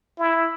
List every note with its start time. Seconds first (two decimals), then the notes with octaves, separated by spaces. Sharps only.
0.18 E4